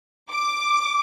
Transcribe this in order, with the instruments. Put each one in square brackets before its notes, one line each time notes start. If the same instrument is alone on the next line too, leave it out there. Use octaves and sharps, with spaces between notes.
[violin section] D6